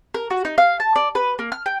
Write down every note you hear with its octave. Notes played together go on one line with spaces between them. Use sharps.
A#4
F#4
D#4
F5
A5
D5
B4
A#3
F6
G5